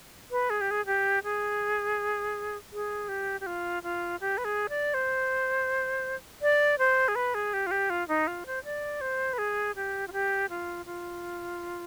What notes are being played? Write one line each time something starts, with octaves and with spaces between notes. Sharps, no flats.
B4
G#4
G4
G#4
G4
G#4
G#4
G4
G4
F4
F4
G4
B4
G#4
D5
C5
D5
C5
G#4
B4
G#4
G4
F4
G4
F4
D#4
F4
C5
D5
C5
B4
G#4
G4
F4
G4
F4
F4